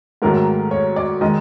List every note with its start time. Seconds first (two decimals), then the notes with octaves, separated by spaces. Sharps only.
0.22 G#2 D#3 F#3 A3 A#4
0.71 C#5
0.96 D5
1.21 D#3 G#3 D#5